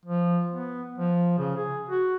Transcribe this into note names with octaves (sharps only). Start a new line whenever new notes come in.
F3
B3
F3
C#3
G#4
F#4